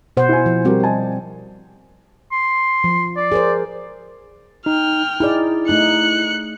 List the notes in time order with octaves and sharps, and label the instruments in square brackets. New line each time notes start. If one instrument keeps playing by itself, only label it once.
[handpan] B2 C5 F#5
[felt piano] E4 G#5
[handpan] F3
[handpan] G3 C4 [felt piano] F#4 G4 A#4
[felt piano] D#5 G#5 A5
[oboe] C6
[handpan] F3
[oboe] D5
[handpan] G#4 A#4 C5
[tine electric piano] D#4 [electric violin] G5 F6
[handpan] D#4 G#4 D5 [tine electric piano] E4
[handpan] A3 D#4 [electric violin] F#6 C#7